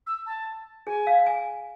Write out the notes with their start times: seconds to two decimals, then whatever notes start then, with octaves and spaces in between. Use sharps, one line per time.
0.07 E6
0.26 A5
0.87 G#4 G#5
1.07 F5
1.27 G#5